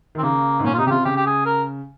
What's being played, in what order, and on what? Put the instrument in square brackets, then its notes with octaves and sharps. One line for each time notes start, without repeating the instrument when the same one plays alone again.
[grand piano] D#3
[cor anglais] C4
[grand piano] C#3 [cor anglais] A#3
[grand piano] G#2
[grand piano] A#2 [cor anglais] C#4
[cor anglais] F4
[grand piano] C3 [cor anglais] D#4
[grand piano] C#3 [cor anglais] G4
[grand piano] C3 [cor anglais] F4
[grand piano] C#3 [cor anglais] G4
[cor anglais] G4
G#4
A#4